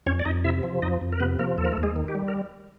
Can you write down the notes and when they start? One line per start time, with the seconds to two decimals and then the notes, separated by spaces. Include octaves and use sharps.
0.06 F2 C#4 C#5
0.19 D5
0.25 F2 D#4 D#5
0.44 C3 E4 E5
0.63 F3
0.82 F2 D#4 D#5
1.01 F2
1.12 A#4
1.20 C3 B3 B4
1.39 F3 A#3 A#4
1.58 D#2 A4
1.65 A#4
1.72 A3 A4
1.77 D#2
1.83 G#3 G#4
1.96 D#3
2.08 G4
2.15 G3
2.28 A#4